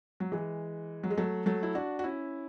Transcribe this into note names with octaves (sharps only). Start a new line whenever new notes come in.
F#3
E3 G#3
F#3
G#3
F#3 A3
F#3 A3
E4
D4 F#4
F#4
C#4 E4